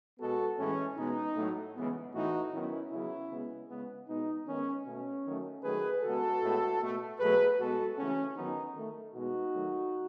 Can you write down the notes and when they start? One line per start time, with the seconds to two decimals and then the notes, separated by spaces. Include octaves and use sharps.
0.19 B2 G#3 B3 F#4 A4
0.58 A2 E3 G#3 C#4
0.97 B2 G#3 B3 D#4
1.36 A2 F#3 A3
1.75 C#3 E3 G#3 B3
2.14 A2 E3 A3 D#4 F#4
2.52 D#3 F#3 B3 C#4 E4
2.91 C#3 F#3 B3 C#4 E4
3.30 C#3 G#3 B3
3.69 C#3 G#3 B3
4.08 B2 G#3 B3 D#4
4.47 D#3 G#3 B3 C#4
4.86 B2 A3 C#4
5.25 D#3 F#3 A3
5.64 D#3 F#3 A3 G#4 B4
6.02 C#3 G#3 B3 F#4 A4
6.42 A2 G#3 B3
6.81 B2 A3
7.19 B2 F#3 A3 G#4 B4
7.58 B2 G#3 B3 F#4 A4
7.97 C#3 E3 A3 C#4
8.36 D#3 F#3 B3 D#4
8.75 D#3 A3
9.14 B2 G#3 B3 D#4 F#4
9.53 D#3 F#3 A3